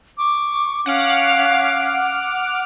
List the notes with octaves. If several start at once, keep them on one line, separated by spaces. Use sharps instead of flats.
C#6 D6
C#4 F5 F#5 D6 F6